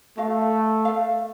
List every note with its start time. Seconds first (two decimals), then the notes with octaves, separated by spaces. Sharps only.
0.18 A3 F#4 F5
0.85 A4 F5